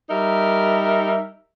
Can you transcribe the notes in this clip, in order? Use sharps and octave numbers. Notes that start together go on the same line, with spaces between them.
G3 D#4 A#4 E5